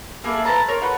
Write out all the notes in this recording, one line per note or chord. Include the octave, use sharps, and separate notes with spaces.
A#3 E4 G#4 A4
B4 C5 A5 A#5
F4 A#4 C#5
A4 B4 C#5 F#5